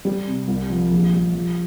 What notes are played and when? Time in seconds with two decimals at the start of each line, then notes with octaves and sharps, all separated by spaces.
0.05 G3
0.27 C3
0.48 C2
0.70 F3
0.91 A#1
1.13 G3
1.35 F3